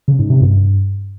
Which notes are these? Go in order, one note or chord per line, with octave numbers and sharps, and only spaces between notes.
C#3
G#2
C3
G2